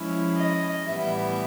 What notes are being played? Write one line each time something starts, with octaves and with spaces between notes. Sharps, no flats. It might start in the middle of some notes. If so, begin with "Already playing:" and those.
Already playing: F3 G#3 C#4 E4
D#5
A2 E3 G3 B3 E5